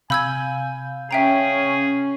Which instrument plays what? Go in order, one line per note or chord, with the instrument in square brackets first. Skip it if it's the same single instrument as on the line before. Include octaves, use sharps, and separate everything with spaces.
[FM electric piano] C3 F5 G6 [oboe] G#5 [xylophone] B5 E6 G#6
[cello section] C#4 [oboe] G#4 [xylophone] E5 G5 A#5